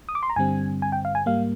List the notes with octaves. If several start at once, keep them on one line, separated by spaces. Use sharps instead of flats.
D#6
D6
C6
A#5
G2 D3 G3 C4 G#5
G#5
G5
F5
G#5
G#2 G3 A#3 F5